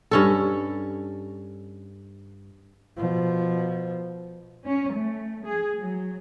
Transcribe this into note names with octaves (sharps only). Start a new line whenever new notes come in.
G2 C#4 A4
B2 F3
C#4
A3
G#4
F#3